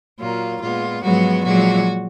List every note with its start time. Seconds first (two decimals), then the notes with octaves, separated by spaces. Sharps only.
0.19 A#2 F#3 A#3 F4
0.61 A#2 G#3 B3 F4
1.02 G#2 F3 F#3 G#3 B3 F#4
1.44 A#2 F3 F#3 G#3 F#4